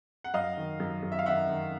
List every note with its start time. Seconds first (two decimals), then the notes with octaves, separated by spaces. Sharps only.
0.24 F#5
0.34 F#2 D#5 F5
0.57 D#3
0.80 F#2
1.03 F#2
1.12 E5
1.19 F5
1.26 D#3 E5 F#5
1.49 D#3